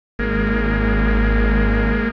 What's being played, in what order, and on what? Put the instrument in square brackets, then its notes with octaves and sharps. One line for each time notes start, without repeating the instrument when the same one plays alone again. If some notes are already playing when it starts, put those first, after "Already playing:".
[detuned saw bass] G#1 [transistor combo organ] G#3 A#3